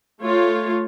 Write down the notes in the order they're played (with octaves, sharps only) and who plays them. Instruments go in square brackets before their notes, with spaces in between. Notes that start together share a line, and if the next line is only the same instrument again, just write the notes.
[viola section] A3 F4 C#5